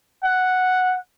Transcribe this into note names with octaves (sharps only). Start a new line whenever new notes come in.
F#5